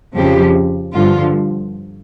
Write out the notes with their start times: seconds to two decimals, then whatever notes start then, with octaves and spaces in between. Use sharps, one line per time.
0.14 F2 C#3 F3 G4
0.95 G2 D3 F3 F4